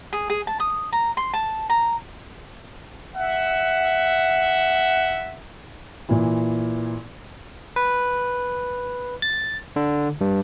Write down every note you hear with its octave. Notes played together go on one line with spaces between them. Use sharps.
G#4
G#4
A5
D#6
A#5
C6
A5
A#5
E5 F#5
A#2 E3
B4
A6
D3
G2